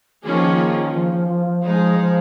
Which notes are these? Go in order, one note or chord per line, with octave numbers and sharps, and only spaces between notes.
D#3 F3 A#3 C#4 F4 G#4
F3
F3
F3
F3
F3 G#3 D#4 G#4
F3